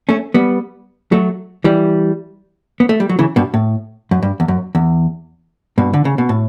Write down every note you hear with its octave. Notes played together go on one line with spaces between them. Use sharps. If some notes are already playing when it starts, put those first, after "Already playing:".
A3 C#4
G3 B3
F#3 A3
E3 G3
B3
A3
G3
F#3
C#3 E3
G2 B2
A2
F#2
G2
E2
F#2
E2
G2 B2
D3
C#3
B2
A2